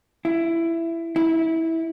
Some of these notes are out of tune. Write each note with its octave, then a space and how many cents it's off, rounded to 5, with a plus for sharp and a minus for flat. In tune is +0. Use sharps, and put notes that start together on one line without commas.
E4 +15
E4 -20